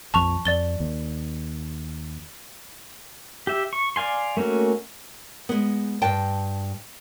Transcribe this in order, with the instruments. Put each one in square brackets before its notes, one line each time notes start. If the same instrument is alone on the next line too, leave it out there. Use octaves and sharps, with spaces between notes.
[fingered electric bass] A#1 F2 [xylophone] A5 C#6 F7
[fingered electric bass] F2 [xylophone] D5 A6 G7
[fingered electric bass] D#2
[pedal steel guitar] G4 E5
C#6
D5 F5 G#5 C6
A3 A#3 C#4 F#4
[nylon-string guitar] G#3 B3
G2 G5 A5